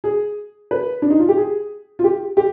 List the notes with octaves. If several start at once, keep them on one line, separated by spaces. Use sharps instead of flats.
G#4
B4
D4
D#4
F4
G4
G#4
F4
G4
G4